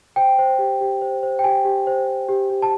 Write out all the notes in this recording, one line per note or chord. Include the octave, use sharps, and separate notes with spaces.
C5 G5
C5
G4
G4
C5
C5
G5
G4 G#5
G4
C5
C5
G4
G4
A5